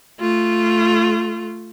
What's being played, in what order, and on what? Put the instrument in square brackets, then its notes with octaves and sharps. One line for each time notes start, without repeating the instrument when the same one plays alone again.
[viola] A3 F4